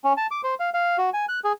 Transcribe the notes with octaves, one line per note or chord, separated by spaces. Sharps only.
C#4
A5
D6
C5
F5
F5
F#4
G#5
F#6
G#4